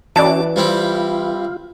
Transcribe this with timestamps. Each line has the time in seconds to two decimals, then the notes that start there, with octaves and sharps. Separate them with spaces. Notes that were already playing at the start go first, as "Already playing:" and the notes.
0.16 E3 C#4 F#4 D5 A5 D6
0.56 G3 C4 E4 F4